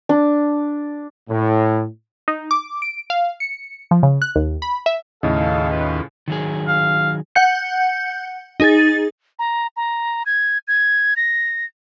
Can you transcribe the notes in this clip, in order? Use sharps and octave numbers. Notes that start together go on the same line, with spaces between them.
D4
A2
D#4
D6
D7
F5
C#7
F3
C#3
F#6
D#2
B5
E5
D#2 A2 C#3 D#4 A4 F5
F4 B4
D#3 F#3 G#4
F5
F#5 G6 C#7
D#4 G#4 A6
A#5
A#5
G#6
G#6
A#6